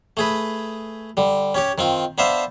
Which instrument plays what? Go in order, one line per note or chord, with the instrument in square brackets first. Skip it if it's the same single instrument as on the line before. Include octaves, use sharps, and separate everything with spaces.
[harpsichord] A3 G#4 B4
D3 G3
C#4 G4 C#5
D#3 C4 F4
B3 D4 C5 E5 F5 A5